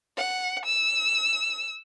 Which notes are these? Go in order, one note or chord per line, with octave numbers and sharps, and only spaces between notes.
F#5
E6